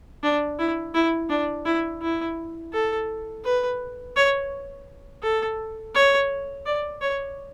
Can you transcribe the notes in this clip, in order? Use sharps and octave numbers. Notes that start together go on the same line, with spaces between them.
D4
E4
E4
D4
E4
E4
A4
B4
C#5
A4
C#5
D5
C#5